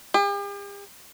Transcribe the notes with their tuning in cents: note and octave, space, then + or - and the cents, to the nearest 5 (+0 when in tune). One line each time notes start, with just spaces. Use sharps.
G4 +45